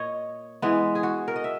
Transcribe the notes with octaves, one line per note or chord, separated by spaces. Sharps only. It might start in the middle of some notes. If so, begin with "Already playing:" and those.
Already playing: A#2 C#5 D#5
E3 G#3 B3 B4
G#4
F#4
A#4
D#5
E5